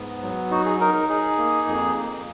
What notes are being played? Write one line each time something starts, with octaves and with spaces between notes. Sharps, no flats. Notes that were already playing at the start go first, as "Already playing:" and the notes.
Already playing: G#2 B3
F#3
D#4 F#4
G#4
D#4 A#4
A#4
D#4 G#4
A#3
F2
A#3